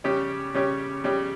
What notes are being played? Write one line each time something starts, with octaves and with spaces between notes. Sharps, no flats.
C#3 G3 C#4 G4 C#5
C#3 G3 C#4 G4 C#5
C#3 G3 C#4 G4 C#5